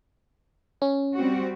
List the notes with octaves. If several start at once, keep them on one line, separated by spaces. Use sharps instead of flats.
C#4
G3 C4 F#4